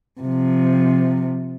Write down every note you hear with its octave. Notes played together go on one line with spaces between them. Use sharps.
C3 F3